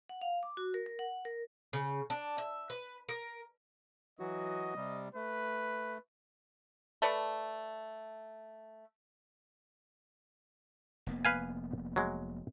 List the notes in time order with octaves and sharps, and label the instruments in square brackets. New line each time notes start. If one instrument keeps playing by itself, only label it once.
[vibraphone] F#5
F5
D6
F#4
A#4
A#4
F#5
A#4
[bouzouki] C#3
D4
E5
B4
A#4
[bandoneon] E3 F#3 F#4 [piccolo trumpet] D#5
[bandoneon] C3 G3
[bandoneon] A3 [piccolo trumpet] B4
[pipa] A3 A4 B4 D5
[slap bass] F1 A#3 B3
[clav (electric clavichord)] B4 F5 G#5
F#3 G#3